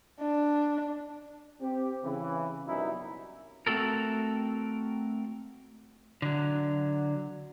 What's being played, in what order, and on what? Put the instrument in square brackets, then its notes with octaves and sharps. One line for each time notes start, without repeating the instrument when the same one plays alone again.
[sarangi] D4
[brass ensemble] C4 G4
C#3 E3
C2 F#2 B2 D#4 E4 E5
[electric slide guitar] A3 C4 F#4 A4 A#4
[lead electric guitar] D3 F#3